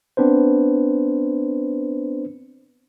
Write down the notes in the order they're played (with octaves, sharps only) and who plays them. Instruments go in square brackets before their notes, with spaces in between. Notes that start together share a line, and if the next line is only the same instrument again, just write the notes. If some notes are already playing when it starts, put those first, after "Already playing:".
[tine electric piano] B3 C4 D4 B4 C5